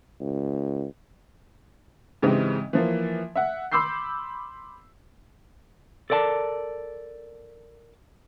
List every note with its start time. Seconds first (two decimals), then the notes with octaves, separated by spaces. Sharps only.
0.21 C#2
2.22 G#2 C#3 E3 C4 D#4 G4
2.73 E3 F3 A#3
3.36 E5 F#5
3.72 B5 C6 D6 E6 G6 C7
6.10 A4 A#4 D5 F#5 A5